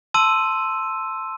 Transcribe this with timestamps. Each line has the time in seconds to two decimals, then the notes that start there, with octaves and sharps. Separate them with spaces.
0.14 A5 C6 E6 D#7